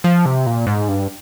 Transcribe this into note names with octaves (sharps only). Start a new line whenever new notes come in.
F3
C3
A#2
G#2
G2